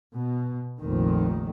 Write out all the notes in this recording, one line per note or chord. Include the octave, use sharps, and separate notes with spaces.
B2
F1 A#1 F2 D#3